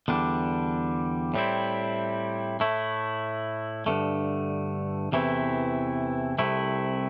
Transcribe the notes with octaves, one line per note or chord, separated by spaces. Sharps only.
E2 D3 G3 D4
A2 G3 C4 E4
A2 A3 E4
G2 D3 A3
E2 C3 E3 A3 E4
C2 C3 A3 E4